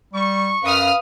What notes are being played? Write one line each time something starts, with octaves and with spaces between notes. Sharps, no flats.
G3 C#6
F#2 B4 F5 D#6 F6